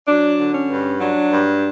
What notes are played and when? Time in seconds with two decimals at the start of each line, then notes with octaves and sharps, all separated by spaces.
0.08 F#3 D4
0.38 D3
0.53 C#4
0.69 G2
0.99 F#3 D4
1.30 G2